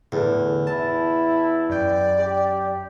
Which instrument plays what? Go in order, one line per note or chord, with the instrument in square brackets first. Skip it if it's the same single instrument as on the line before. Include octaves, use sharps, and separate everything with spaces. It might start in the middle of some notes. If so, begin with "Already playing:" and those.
[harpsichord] E2 [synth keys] A2 D3
[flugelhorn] E4 [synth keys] A5
[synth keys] F#2 G5 [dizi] D5
[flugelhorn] G4